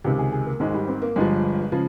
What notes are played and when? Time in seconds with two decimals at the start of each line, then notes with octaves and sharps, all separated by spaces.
0.04 C#2 C3 D#3 G4
0.19 G#4
0.32 G#4
0.46 A#3
0.60 G#1 G#2 D#3 G#3
0.74 G3
0.88 C4
1.02 A#3
1.16 G1 G2 F3 G#3
1.72 C#3 F3